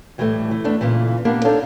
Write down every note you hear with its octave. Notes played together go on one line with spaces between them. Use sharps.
A2 E3 F#3 G3 A3
E3
A3 B3 D4
A#2 C#3 E3
A#3 B3 D4 G4 A#4
D4 D#4 A4 C#5 F5